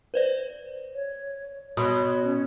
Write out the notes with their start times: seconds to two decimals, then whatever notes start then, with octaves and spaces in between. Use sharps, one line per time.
0.14 B4 C5 D5
0.94 C#5
1.77 B2 C#5 B5 C6 D#6
2.24 C#4